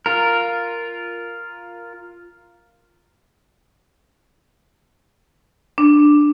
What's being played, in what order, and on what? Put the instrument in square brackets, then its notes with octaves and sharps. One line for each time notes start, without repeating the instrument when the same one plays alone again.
[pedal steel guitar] F4 A#4
[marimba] D4